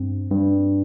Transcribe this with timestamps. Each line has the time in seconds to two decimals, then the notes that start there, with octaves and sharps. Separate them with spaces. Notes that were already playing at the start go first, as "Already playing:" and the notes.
Already playing: G2 C4
0.31 G2